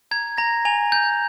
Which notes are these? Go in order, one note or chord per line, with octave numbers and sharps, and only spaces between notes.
A#5 G#6
A#5 A#6
G#5 F7
G6